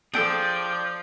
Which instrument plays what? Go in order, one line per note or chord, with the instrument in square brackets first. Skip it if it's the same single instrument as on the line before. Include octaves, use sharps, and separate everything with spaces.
[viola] F3 D5 [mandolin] D4 A4 [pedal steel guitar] G#4 G5 [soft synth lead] G6